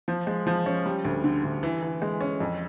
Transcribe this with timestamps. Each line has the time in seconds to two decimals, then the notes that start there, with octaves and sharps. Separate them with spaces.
0.08 F3
0.27 G#3
0.47 F3
0.66 C#4
0.86 G3
1.05 D2
1.24 D3
1.44 D2
1.63 E3
1.82 E3
2.02 G#3
2.21 C#4
2.40 F2